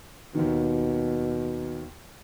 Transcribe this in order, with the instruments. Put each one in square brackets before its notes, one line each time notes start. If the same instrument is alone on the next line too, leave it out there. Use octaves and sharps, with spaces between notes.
[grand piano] D#2 D#3 [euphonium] B2